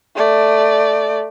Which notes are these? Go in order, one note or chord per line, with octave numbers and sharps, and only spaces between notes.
A3 D5